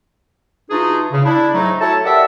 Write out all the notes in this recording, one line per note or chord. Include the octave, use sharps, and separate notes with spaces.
E3 D4 D#4 F4 F#4 G#4
C#3
D4 E4
G#2 F#3 A3 D#4
E4 F#4 A4 C#5 A5
G4 A#4 D5 E5 F#5 A5